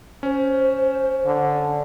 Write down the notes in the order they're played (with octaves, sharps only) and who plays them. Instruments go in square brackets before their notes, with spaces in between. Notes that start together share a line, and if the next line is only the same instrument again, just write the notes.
[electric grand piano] C#4 [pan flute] C5
[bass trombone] D3